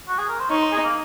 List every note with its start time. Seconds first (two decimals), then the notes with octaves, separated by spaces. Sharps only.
0.08 F#4
0.19 G#4
0.29 A#4
0.40 C5
0.50 D#4 C#5
0.61 C5
0.72 G#4
0.84 A#3